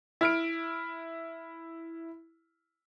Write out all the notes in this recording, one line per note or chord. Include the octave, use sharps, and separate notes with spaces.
E4 F6 D7